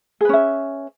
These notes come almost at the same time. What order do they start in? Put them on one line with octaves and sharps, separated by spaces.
G#4 B4 C#4 E5